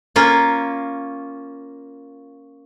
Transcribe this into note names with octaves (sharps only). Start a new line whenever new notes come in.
A#3 C#4 F4